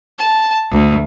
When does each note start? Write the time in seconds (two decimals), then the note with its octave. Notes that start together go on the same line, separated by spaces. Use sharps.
0.20 A5
0.70 D2